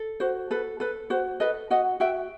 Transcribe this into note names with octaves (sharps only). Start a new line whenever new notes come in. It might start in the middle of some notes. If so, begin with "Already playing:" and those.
Already playing: A4
F#4 C5
A4 B4
A4 B4
F#4 C5
A4 B4 D#5
F#4 D#5 F#5
F#4 E5 G5